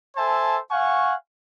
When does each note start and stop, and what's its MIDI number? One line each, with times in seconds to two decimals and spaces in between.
0.17 0.57 69
0.17 0.57 72
0.17 0.57 76
0.17 0.57 80
0.17 0.57 81
0.70 1.14 77
0.70 1.14 78
0.70 1.14 80
0.70 1.14 85